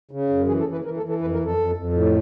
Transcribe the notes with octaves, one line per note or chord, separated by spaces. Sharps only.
C#3
F#2
E3 G#4
A4
E3
B4
E3 A#4
A4
E3
A4
F2 B4
A#4
F2
A4
F2
F2
A2